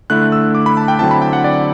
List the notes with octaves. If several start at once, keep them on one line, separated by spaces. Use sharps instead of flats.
D3 A3 E4 F#6
E6
D6
B5
A5
G5
D3 F#3 C4 E4 A5
B5
G5
F#5
D5